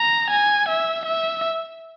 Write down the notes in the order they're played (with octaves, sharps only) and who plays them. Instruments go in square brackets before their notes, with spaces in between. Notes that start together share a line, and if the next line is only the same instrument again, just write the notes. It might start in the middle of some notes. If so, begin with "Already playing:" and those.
Already playing: [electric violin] A#5
G#5
E5
E5